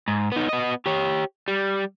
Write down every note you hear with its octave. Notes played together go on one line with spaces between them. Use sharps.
G#2
B3 D#4
B3 D#5
G4 C#5
G3